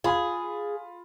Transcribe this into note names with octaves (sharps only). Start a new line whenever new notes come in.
F4 G#4 B5